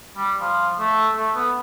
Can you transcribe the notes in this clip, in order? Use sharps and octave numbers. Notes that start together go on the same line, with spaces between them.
G3
F3
A3
A3
B3